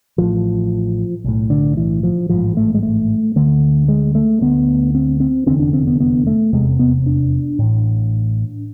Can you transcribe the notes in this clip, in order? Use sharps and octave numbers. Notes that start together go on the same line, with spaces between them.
A1 A2 F3
B1 A2
D3
E3
F3
A1 G#2 F3
A3
G#3
A3
D2 D3 A3
G#3
A3
D2 D3 B3
C4
C4
F1 E2 D3 C4
D4
C4
B3
B3
A3
F1 E2 C3 G#3
B3
D4
A1 A2